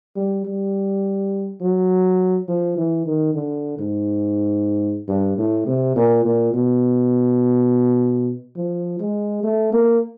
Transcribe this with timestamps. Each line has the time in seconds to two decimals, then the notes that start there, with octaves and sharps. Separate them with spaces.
0.16 G3
0.45 G3
1.61 F#3
2.48 F3
2.77 E3
3.05 D#3
3.34 D3
3.78 G#2
5.08 G2
5.38 A2
5.67 C3
5.96 A#2
6.25 A#2
6.54 B2
8.56 F3
9.00 G#3
9.43 A3
9.72 A#3